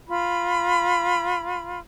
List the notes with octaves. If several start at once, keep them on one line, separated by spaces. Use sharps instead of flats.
F4 B5